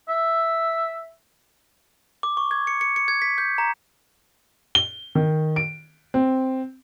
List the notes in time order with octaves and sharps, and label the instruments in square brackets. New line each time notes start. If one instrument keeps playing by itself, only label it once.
[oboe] E5
[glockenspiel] D6
C#6
G#6
C#7
C#7
C#7
G#6
B6
G6
A#5
[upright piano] G7
D#3
D7
C4